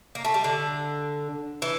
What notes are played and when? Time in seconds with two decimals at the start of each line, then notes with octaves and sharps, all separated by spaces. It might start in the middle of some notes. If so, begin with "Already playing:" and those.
0.15 A#3
0.25 A3
0.34 G3
0.44 D3
1.62 E3